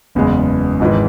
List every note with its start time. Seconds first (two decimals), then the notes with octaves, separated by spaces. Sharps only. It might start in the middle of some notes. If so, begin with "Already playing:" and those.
0.15 F#1 E2 C#3 G#3 B3
0.80 G#1 G#2 E3